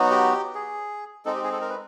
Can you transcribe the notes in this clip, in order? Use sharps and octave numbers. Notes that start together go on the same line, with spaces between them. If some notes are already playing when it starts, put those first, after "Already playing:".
Already playing: F#3 B3 D#4 F#4
G4
G#4
G#3 C4 D#4 A4
G4
G#4
A4
A#4
B4